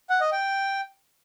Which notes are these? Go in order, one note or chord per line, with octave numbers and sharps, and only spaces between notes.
F#5
D#5
G5